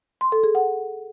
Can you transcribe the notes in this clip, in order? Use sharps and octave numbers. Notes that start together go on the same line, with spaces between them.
C6
A4
G#4
F#5